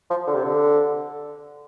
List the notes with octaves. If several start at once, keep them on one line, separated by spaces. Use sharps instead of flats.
F3
D3
C3
D3